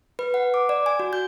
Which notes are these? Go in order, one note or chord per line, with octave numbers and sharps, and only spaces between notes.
B4
F#5
D6
D5
G#5
F#4
G6